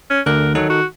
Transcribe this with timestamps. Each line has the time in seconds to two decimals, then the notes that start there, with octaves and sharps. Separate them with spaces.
0.10 C#4
0.26 D2 D3 A#4 F#6
0.55 D#3 F#3 D#4 A4
0.70 F#4